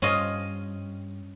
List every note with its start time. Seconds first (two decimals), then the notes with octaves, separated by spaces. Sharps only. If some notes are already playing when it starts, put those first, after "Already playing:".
0.02 G2 C#4 F4 D#5